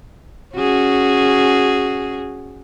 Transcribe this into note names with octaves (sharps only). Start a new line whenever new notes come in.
C#4 F#4 G#4